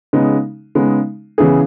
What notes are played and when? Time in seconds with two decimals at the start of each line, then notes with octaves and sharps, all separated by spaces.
0.13 C#3 G#3 B3 D#4
0.75 C#3 G#3 B3 D#4
1.38 C#3 E3 B3 E4 G#4